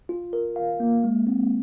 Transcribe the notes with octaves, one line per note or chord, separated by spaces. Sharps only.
F4
A#4
F5
A#3
G#3
C4